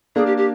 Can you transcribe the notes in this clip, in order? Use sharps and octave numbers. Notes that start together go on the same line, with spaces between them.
A#3 D4 G#4
G4
G4